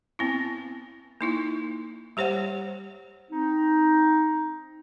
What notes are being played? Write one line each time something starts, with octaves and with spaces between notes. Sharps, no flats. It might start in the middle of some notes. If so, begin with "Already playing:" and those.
B3 C4 E4
A#3 D#4 E4
G3 G4 C5 C#5 F#5
C4 D#4